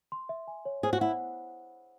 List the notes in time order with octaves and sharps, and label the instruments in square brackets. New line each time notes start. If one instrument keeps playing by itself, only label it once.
[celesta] C6
E5
G#5
C#5
[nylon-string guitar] G#4 [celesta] C5
[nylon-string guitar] F#4
[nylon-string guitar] E4 [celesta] F#5